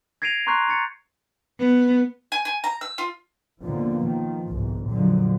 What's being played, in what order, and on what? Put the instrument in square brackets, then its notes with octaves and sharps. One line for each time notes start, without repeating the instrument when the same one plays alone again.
[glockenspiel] G#6 A#6 C7 D7 D#7 F7
A#5 C6 C#6 F#6 G6 C7
C#6 A6 C#7
[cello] B3
[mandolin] G#5
G#5
A#5
E6
F4
[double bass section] D#2 B2 D3 F3 A#3
D#3 F3
G1 C2 G#2
F2 A#2 D3 F3 F#3 G#3